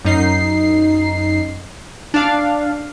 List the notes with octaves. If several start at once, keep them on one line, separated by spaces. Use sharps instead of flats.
F#2 D#4 C7
D4 F5